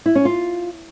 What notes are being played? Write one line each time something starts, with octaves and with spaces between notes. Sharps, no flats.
E4
C#4
F4